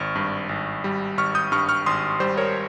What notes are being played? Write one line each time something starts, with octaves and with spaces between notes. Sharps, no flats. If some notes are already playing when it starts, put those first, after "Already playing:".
Already playing: G#1 C#6 F6
G2
G#1
G3
G#1 C#6 F6
D#6 G6
G2 C#6 F6
C#6 F6
G#1 C6 D#6
G3 C5
A#4 C#5